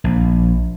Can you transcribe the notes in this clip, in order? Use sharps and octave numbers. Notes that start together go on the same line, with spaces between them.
A#1